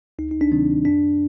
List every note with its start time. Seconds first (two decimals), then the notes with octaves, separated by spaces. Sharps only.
0.19 D2 D#4
0.31 D#4
0.41 D4
0.52 C3 D#3 F#3 C4
0.85 F#2 D4